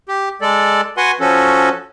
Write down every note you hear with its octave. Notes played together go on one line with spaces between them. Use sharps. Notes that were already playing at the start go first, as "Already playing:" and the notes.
G4
G#3 A4 D5
F#4 B4 F#5 G#5 C6
F3 C#4 F#4 A4